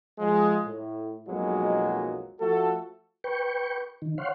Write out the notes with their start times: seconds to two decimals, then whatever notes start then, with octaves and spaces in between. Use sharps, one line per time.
0.19 F3 G#3
0.65 A2
1.28 B1 F2 B2 F#3 G#3 A#3
2.40 F3 A3 F#4 A4
3.24 B4 G5 C#6
4.02 D#3
4.18 C#5 F5 F#5 C6